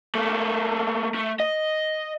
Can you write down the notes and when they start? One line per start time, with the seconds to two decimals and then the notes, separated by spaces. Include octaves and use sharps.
0.15 A3 A#3
1.15 A3
1.40 D#5